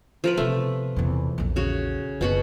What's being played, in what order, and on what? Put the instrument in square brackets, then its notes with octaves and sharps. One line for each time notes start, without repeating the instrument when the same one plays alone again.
[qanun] F3 A#4 B4
[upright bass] C3 B3 [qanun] A3
[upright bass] E2 C3
A#1 E2
[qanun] C#3 F#4
[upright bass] F#1 [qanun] B2 F#4 F#5